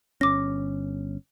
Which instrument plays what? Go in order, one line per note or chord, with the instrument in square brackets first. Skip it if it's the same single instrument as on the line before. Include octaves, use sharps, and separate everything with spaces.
[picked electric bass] G1 C#4 [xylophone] D6 A#6